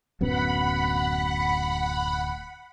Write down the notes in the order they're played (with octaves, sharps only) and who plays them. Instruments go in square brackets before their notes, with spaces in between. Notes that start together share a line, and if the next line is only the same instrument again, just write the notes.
[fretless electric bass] D1 F#2 B3 [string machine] F#5 B5